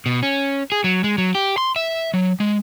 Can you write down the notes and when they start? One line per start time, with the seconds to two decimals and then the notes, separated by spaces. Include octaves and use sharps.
0.06 B2
0.23 C#4
0.72 G#4
0.84 F#3
1.04 G#3
1.18 F#3
1.35 G4
1.58 C6
1.76 E5
2.14 F#3
2.40 G#3